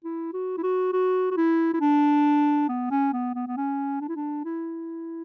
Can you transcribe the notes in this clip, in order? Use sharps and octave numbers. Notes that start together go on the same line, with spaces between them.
E4
F#4
E4
F#4
F#4
F#4
E4
E4
D4
B3
C#4
B3
B3
B3
C#4
D4
E4
D4
E4